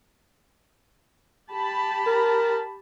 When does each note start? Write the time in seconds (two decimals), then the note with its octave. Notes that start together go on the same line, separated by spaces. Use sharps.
1.52 G4 A5 B5
2.07 A#4